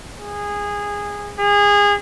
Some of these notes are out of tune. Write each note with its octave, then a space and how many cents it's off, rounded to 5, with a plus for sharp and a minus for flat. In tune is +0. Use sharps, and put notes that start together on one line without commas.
G#4 -20
G#4 -25